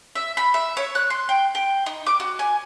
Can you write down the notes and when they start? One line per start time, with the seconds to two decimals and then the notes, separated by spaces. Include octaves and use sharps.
0.15 E5
0.37 B5
0.54 E5
0.77 C#5
0.95 F#6
1.10 C6
1.29 G5
1.55 G5
1.86 D#4
2.06 D6
2.20 F#4
2.39 G#5